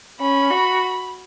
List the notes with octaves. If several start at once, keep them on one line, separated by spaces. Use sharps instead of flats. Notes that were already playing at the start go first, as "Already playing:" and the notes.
C#4 B5
F#4